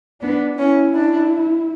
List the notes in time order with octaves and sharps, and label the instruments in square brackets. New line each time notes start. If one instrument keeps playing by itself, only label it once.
[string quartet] B3 [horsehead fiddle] D4
[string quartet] C#4 [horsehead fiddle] E4
[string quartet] D4